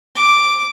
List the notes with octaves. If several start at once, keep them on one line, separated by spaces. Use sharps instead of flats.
D6